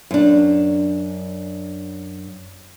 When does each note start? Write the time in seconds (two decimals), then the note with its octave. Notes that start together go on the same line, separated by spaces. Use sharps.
0.11 F#2 D4